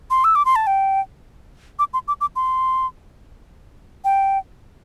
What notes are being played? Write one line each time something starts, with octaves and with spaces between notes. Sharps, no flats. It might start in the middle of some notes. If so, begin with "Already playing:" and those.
C6
E6
D6
C6
A5
G5
D6
C6
D6
D6
C6
G5